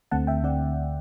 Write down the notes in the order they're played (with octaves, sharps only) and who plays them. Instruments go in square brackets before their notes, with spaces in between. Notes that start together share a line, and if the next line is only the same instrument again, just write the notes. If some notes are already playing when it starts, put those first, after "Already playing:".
[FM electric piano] D2 D3 A3 C4 F#5 A5
E5 G5
D3 A3 C4 D5 F#5